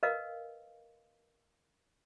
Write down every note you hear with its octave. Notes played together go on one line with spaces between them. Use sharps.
A#4 B4 D#5 F5